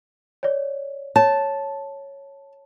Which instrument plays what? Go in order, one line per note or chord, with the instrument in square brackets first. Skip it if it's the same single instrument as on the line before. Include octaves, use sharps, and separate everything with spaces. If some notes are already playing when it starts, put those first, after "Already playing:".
[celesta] C#5 D5
[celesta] C#5 [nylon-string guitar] A5